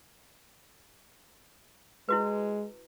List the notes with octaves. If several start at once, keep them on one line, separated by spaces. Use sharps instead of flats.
G#3 E4 F#4 B4